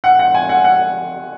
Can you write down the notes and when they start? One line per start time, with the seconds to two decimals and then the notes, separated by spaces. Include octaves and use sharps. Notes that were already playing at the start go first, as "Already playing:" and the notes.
0.04 F#5
0.19 F#5
0.34 G#5
0.49 F#5
0.64 F#5